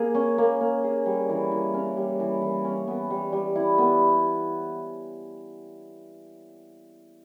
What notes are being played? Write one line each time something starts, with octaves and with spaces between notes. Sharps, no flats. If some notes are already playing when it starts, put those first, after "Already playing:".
Already playing: A#3 G#4
C#4
A#3
A#3
G#4
G3
E3
E3
C#4
G3
E3
E3
C#4
B3
G3
G3
E4
B3